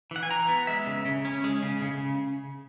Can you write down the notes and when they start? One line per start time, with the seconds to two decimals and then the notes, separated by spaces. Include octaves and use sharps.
0.11 E3 F#5
0.23 G#5
0.30 E3 A#5
0.48 B3
0.67 G#3 E5
0.87 C#3
1.05 C#3
1.25 C#4
1.44 G#3
1.63 C#3
1.82 C#3